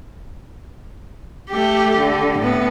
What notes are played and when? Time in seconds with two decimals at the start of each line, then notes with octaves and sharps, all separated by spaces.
1.50 A3 G4
2.00 D3
2.39 A2 B3